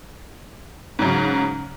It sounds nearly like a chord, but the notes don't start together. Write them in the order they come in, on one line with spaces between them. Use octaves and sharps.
G#2 F#3 C#3